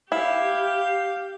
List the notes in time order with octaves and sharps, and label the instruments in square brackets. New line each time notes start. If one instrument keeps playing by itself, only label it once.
[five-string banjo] E4 [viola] G4 [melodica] F5